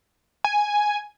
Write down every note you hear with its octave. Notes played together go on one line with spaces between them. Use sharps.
G#5